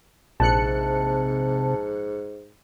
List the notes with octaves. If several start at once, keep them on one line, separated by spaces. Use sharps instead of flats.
A#1 G#2 C3 A5 F#6 C#7